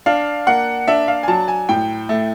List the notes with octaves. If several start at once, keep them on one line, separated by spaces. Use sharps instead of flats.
D4 F5
A#3 F#5
D4 E5
F5
G#5
F#3 A5
G#5
A2 G5
A3